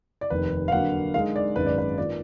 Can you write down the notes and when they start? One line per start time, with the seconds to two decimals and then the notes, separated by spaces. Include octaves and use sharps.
0.21 D5
0.30 F1 D#2 D#3 B4
0.68 F5
0.72 D3 F#3 A#3 F#5
1.14 D3 G#3 D#4 A#4 F5
1.36 D5
1.56 G#1 F#2 D#3 G#3 B4
1.67 D5
1.78 B4
1.97 D#3 A#3 F4 B4 D5